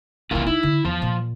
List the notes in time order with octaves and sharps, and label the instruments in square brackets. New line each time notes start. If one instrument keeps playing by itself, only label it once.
[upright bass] C2 E3 [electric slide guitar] A#3 E4 F4
[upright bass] D#4 [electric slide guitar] E4
[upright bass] D3
[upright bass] E2 [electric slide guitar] F3
[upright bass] A#2